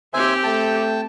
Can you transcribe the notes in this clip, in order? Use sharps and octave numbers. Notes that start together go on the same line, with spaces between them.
D#2 C4 G4 C5 E5 G#5
A3 G5 A5